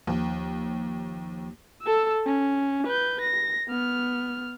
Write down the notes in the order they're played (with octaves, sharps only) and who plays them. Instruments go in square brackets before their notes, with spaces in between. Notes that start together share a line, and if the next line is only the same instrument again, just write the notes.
[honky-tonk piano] D#2 [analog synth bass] F3
[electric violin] A4 E6
C#4
B4 G6
A#6
B3 F6